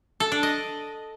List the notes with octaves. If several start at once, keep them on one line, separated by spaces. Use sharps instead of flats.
A4
D4
D#5